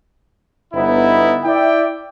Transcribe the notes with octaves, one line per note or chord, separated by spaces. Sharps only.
G1 B3 D#4 E4
E4 D5 E5 G5